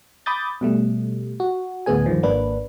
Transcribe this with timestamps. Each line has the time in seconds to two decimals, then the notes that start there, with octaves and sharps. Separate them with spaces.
0.26 B5 D6 D#6 G6 A6
0.61 B2 G3 A3
1.40 F#4
1.86 D2 A2 D3 B3 G#4 G#5
2.06 G2 D#3 F3
2.23 G#1 A#3 D4 B4